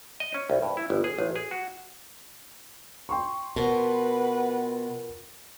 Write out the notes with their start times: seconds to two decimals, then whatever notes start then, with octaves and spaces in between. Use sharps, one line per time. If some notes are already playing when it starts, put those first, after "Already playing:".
0.20 D#5
0.34 C#4
0.50 C2
0.62 G2
0.77 E4
0.90 G1
1.04 G#4
1.19 A1
1.36 G#4
1.51 F#4
3.09 G5 C6 C#6
3.56 B2 F3 A#4 B4 F#5